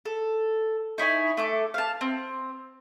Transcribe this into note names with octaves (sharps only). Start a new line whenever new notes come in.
A4
D#4 E4 C#5 G#5
A3 A4 D6
F5 A5
C4